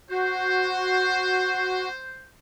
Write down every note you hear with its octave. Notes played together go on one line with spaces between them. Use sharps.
F#4 C5